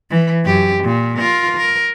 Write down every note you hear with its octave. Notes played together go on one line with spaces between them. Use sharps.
E3
F#2 G4
A#2
F4 A#4
A#4